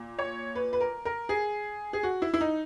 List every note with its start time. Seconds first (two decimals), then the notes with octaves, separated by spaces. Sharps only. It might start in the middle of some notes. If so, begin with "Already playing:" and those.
Already playing: A#2
0.18 C#5
0.55 B4
0.73 B4
0.80 A#4
1.05 A#4
1.29 G#4
1.93 G#4
2.03 F#4
2.22 E4
2.34 E4
2.41 D#4